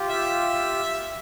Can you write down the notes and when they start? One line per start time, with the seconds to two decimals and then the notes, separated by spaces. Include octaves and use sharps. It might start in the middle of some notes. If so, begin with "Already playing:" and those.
Already playing: F4 G4
0.09 E5